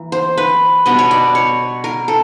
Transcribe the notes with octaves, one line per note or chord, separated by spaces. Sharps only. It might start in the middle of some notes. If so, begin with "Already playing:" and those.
Already playing: E3 A#3
C5
B4
B2 G3 B3 D4 D#5
C#5
D5
C#5
A#4
A4